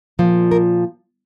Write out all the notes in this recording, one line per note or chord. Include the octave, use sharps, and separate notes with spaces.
A#2 F3
A#4